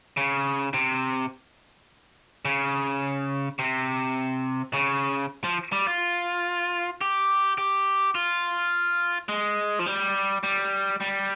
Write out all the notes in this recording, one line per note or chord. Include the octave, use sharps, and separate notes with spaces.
C#3
C3
C#3
C3
C#3
F3
G3
F4
G4
G4
F4
G#3
F3
G3
G3
G3